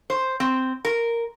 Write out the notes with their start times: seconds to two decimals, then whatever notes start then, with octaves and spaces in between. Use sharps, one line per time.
0.10 C5
0.40 C4
0.85 A#4